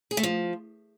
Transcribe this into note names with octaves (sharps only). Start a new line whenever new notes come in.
G#4
A3
F3